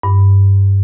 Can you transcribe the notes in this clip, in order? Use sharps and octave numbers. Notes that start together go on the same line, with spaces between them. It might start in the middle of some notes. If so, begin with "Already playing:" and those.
G2